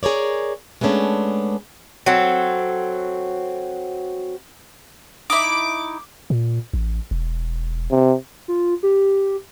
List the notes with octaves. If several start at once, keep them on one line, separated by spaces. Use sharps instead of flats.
G#4 A#4 C#5 D5
G#3 A3 B3 C#4 D4
F#3 C4 A4
D#4 E4 D6
A#2
A1
E1
C3
F4
G4